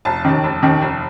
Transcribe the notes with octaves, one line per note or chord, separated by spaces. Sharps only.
F1 A5
D#2 D#3
F1
D#2 D#3
F1